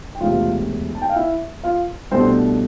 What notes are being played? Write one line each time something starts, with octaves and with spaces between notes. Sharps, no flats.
G5
E1 D2 C3 F4 F5
A5
G5
F5
E4 E5
F4 F5
C2 B2 A3 C4 D4 C5